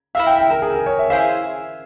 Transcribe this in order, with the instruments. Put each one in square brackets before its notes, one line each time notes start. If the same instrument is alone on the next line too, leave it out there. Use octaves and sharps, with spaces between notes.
[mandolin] E4 A#4 E5 [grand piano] F5
[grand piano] G5
G5
A#4
G#4
A#4
C#5
E5
[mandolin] E4 G#4 C5 E5 [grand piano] F5